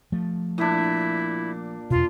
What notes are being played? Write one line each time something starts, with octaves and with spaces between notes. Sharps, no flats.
F3 A3
A#2 D4 E4
E2 B2 F4